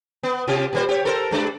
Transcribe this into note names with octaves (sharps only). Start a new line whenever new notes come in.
B3
C3 F4 G4
A#2 G3 C5
G4 C#5
A4 A#4 C5
G2 G#3 D4